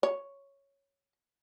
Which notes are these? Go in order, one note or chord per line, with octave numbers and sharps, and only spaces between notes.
C#5